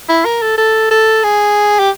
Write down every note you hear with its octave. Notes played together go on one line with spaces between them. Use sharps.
E4
A#4
A4
A4
A4
G#4
G4